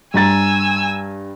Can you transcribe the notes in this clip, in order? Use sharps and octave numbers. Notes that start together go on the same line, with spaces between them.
G2 G#5 A#5 E6 A6